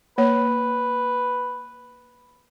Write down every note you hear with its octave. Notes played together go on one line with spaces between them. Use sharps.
A#3 B4 C#5